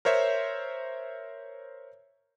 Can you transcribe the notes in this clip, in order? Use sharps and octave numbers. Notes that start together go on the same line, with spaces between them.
A#4 C5 C#5 E5